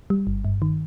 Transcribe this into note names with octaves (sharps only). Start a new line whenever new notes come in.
G3
G1
G2
D#3